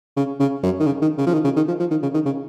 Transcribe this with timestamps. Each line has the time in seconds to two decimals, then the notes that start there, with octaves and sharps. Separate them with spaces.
0.17 C#3
0.40 C#3
0.63 F#2
0.80 D#3
0.86 C#3
1.02 D#3
1.18 C#3
1.27 F3
1.33 D#3
1.44 C#3
1.56 D#3
1.68 F3
1.80 F3
1.91 D#3
2.03 C#3
2.14 D#3
2.26 C#3